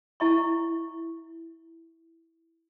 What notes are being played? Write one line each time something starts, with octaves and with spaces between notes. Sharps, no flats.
E4 E5 C#6